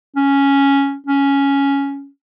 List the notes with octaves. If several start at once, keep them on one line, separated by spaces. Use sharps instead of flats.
C#4
C#4